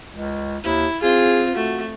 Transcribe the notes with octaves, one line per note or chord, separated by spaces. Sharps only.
C#2
D#2 E4
C4 F4 G#4
A3 F#4